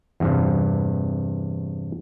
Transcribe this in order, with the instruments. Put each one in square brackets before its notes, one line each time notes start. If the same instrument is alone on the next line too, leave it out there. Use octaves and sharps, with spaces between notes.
[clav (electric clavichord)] E2 G2 C3